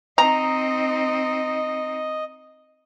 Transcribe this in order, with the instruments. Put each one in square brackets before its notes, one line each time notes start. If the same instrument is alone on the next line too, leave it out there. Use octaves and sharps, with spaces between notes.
[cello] C4 D#4 [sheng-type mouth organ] D#5 [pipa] A#5